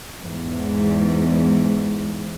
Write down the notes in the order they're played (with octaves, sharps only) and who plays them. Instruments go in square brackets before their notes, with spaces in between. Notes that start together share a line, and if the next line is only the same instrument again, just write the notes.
[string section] E2 G#2